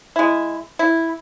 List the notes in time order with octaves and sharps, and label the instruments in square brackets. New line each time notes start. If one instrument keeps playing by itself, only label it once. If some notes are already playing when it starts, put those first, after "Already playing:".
[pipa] G#3 E4
E4